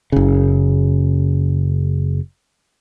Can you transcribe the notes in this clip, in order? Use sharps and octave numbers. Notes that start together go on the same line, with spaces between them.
F#1 C#3